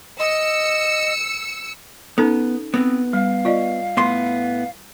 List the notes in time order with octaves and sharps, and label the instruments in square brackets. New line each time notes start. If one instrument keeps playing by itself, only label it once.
[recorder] D#5 [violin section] E6 C#7
[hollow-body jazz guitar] B3 [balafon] C#4 D#4 A4
[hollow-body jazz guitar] B3 [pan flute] C4
[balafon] G3 [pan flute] F5
[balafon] F4 D5 D#5
[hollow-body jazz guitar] A2 B3 C6